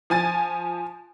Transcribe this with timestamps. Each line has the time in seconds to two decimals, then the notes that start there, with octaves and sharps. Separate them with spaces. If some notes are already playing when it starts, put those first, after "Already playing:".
0.10 F3 G#5 A6